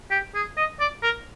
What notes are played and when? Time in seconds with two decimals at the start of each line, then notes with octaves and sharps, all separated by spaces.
0.11 G4
0.35 G#4
0.57 D#5
0.80 D5
1.03 A#4